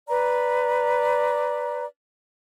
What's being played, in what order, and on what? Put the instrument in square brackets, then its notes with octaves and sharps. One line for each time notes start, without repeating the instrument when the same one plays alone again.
[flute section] B4 D5 A#5